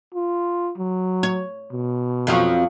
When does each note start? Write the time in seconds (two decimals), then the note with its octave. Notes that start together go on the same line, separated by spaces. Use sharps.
0.15 F4
0.78 F#3
1.23 C#5
1.72 B2
2.27 F2 F3 F#3